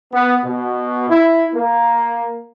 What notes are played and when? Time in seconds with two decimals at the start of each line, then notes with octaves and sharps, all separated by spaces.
0.13 B3
0.44 B2
1.10 E4
1.54 A#3